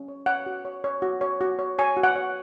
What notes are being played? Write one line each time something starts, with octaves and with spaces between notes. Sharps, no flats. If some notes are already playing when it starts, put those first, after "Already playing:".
Already playing: C#4
C#5
C#5 F#5
F#4
C#5
C#5
F#4
C#5
F#4
C#5
C#5 G#5
F#4
F#5
C#5